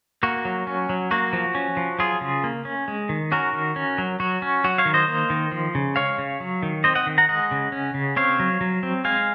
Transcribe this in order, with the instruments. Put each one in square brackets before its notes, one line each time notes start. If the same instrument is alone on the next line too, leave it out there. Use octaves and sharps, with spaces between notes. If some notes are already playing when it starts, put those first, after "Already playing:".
[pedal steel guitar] A#3 F#4
F#3
C#4
F#3
A#3 F#4
F3
C#4
F3
F#3 F4 G#4
C#3
A#3
C#4
G#3
D#3
C#4 F#4 A#4
D#3
C#4
F#3
F#3 F#4
C#4
F#3 F#4
C#5 F5
D#3
C5 D#5
A#3
D#3
F3
C#3
G#3 C#5 F5
C#3
F#3
D#3
C4 C5 D#5
D#5 F#5
D#3
F#5 A#5
G#3 D#5 F#5
C#3
C#4
C#3
C4 C#5 F5
F#3
F#3
C4
G#3 F5 G#5